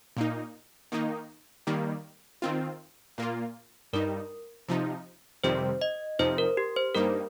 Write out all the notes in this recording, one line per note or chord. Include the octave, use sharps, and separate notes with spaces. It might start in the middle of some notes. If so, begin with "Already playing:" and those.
A#2 A#3 D#4
D#3 A#3 D#4
D#3 G3 A#3
D#3 C4 F4
A#2 A#3 F4
G2 G3 D#4 A#4
C3 F3 D#4
F2 C3 D#3 G3 C4 C5
D#5
F2 C3 F3 D#4 C5
A#4
G4
C5
G2 G3 A#3 D#4 A#4